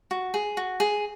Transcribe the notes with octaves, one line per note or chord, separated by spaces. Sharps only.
F#4
G#4
F#4
G#4